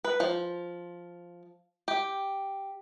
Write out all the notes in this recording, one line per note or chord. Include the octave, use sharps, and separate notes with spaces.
B4
F3
G4